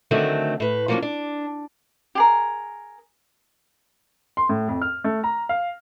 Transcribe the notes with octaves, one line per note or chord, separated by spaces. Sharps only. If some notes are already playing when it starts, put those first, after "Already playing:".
D3 D#3 F#3 A3 C4
A2 B4
F3 F#3 A#3 B3 C#4 D4
D4
G4 G#4 A#4
C6
A2
F2
F6
A3
A#5
F5